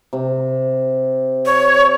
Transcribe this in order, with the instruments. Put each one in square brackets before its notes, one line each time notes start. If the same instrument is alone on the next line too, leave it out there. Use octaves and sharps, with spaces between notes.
[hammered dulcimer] C3
[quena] C#5